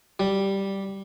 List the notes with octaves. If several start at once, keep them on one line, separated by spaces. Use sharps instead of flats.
G3